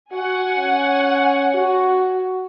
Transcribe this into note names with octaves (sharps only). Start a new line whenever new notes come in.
F#4 F#5 G#5
C#4
F#4